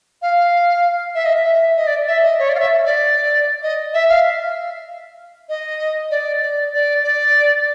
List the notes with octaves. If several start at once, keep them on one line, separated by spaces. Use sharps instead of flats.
F5
E5
D#5
E5
D#5
D5
E5
D#5
C#5
D5
F5
E5
D5
D#5
E5
F5
D#5
D5
D5
D5
D5